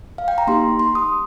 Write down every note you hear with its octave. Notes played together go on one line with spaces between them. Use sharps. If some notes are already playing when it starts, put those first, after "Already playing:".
F5
G5
A#5
A#3 D#4 G4 C6
C6
D#6